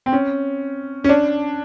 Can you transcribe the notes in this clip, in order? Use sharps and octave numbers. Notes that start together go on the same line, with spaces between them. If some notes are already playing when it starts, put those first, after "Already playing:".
C4
C#4
C#4
D4